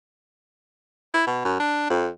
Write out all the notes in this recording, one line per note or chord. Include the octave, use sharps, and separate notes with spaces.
E4
B2
F#2
D4
F2